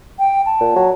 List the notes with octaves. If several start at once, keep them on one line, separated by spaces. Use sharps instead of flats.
G5
A5
A#2
F#3